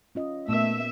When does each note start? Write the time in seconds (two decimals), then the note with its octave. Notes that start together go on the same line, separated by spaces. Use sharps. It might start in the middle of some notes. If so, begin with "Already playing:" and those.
0.15 C#4 F4 D#5
0.49 A#2 A3 B3 A#4 E5